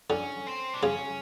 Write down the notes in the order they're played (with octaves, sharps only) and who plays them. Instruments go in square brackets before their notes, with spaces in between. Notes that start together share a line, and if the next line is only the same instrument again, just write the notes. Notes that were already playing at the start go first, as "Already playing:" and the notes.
[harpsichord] D3 [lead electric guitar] C#4
[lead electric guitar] C4
D4
[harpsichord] C#3 [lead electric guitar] C#4